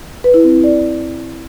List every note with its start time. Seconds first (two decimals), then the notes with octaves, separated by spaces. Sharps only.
0.24 B4
0.34 E4
0.44 C4
0.54 E4
0.64 D5